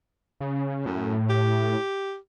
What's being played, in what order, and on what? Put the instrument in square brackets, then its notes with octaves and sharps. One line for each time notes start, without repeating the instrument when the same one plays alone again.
[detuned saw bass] C#3
[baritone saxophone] F#2 [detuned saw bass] A2
[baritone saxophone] G4